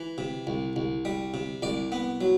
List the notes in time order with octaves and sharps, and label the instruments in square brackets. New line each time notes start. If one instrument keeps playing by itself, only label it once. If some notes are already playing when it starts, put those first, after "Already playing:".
Already playing: [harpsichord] E3
C3
C2
C2
G3
C3
C2 D5
B3
F#3